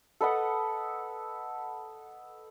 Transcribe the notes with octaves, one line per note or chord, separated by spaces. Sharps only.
A4 B4 D#5 F#5